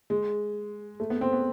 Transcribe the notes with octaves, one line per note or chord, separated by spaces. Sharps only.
G#3
A3
B3
C4
B3